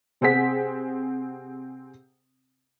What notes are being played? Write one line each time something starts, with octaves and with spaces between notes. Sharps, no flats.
C3 C4 G#4 F#5 B6